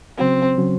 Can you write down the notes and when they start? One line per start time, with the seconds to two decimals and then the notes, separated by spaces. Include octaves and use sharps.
0.18 C#3 F#3 C4 C#4 F#4
0.58 C#3 F#3 C#4 F#4